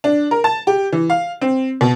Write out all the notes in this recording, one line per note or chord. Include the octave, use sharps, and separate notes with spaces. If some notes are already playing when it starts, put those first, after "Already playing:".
D4
A#4
A5
G4
E3
F5
C4
B2